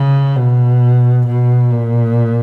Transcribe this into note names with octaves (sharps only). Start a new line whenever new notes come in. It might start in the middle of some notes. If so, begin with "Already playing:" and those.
Already playing: C#3
B2
B2
A#2